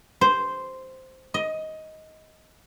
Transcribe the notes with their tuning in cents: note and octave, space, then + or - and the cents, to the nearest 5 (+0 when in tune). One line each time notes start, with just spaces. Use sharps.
C5 -5
D#5 +15